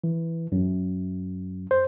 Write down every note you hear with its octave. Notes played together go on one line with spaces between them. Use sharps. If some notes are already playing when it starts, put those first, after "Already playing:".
E3
F#2
C5